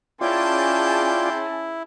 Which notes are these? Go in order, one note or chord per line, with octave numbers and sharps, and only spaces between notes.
C#4 E4 F4 G#4 D5 G5 A5 C6